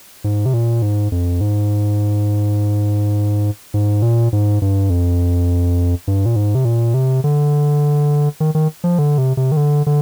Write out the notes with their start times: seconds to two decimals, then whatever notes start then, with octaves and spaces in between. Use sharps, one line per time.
0.24 G#2
0.46 C3
0.54 A#2
0.82 G#2
1.12 F2
1.41 G#2
3.74 G#2
4.02 A#2
4.33 G#2
4.62 G2
4.90 F2
6.07 G2
6.26 A#2
6.36 G#2
6.55 C3
6.65 A#2
6.94 C3
7.24 D3
8.40 D#3
8.55 D#3
8.84 F3
8.99 D3
9.18 C3
9.37 C3
9.52 D#3
9.57 D3
9.86 D3